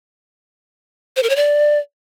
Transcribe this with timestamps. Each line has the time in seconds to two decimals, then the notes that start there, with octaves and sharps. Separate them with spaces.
1.16 C5
1.23 A#4
1.29 C#5
1.36 D5